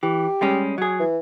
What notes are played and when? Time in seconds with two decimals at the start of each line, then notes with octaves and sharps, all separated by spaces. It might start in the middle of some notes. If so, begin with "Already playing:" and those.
0.03 E3 G4
0.41 G3 G#3 C#4
0.78 F#3 G#4
1.00 E3